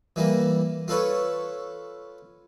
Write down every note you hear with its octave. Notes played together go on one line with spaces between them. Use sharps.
E3 G3 A#3
F4 A4 B4 C#5